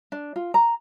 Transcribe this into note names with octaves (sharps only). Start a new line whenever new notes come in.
D4
F4
A#5